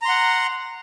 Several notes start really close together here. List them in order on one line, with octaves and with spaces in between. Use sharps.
A#5 C6 F#5